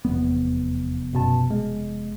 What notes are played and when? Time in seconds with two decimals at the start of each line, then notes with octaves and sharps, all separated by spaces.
0.05 F1 E2 B3
1.13 F#2 B2 A5
1.51 G#3